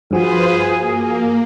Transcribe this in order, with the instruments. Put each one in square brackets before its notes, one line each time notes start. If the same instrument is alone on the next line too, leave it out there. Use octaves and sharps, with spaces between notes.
[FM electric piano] G2 F3 F#4 [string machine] F4 B4 C5 [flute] G#4
[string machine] A#3